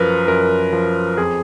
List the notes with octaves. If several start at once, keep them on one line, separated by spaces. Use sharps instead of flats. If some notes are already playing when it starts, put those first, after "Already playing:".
Already playing: F#2 F3 A#4 B4
F#2 A#4
F3
F2 G#4